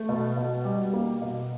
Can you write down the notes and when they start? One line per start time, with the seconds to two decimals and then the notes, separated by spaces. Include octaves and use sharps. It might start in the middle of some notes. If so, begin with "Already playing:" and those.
Already playing: A3
0.09 B2
0.37 B2
0.65 G3
0.93 A#3
1.22 B2